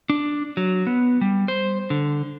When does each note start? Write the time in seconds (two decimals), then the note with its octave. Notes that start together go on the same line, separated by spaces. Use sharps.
0.10 D4
0.57 F#3
0.87 B3
1.21 G3
1.48 C5
1.90 D3